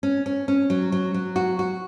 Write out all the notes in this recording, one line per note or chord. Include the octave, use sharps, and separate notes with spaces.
C#4
C#4
C#4
F#3
F#3
F#3
F#4
F#4